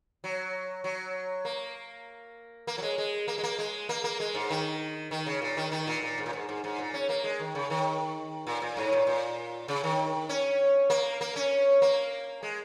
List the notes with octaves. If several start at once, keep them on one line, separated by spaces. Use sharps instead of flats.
F#3
F#3
A#3
A#3
F#3
G#3
G#3
A#3
G#3
A#3
G#3
A#3
A#3
G#3
G#2
D#3
D#3
C#3
A#2
D#3
D#3
A#2
A#2
G#2
A#2
G#2
G#2
G#2
A#2
C#4
A#3
G#3
D#3
C#3
D#3
A#2
A#2
G#2
A#2
A#2
C#3
D#3
C#4
A#3
A#3
C#4
A#3
G#3